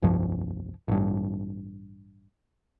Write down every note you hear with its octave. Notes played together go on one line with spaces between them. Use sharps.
F1 C2 G2 F3
A1 G2